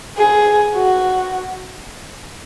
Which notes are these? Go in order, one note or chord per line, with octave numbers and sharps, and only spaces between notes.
G#4
F#4